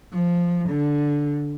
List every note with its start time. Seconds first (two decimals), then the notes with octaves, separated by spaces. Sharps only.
0.13 F3
0.69 D3